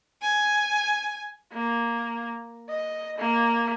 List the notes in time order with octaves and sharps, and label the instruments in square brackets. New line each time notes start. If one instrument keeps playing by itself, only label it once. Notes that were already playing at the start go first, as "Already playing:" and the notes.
[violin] G#5
[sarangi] A#3
D#5
A#3